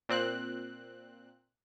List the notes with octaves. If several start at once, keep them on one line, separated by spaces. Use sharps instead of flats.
A#2 C4 F#6